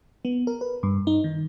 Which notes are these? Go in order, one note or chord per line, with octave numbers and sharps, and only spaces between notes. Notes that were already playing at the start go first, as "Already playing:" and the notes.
B3
A#4
B4
G2
D#4
D#3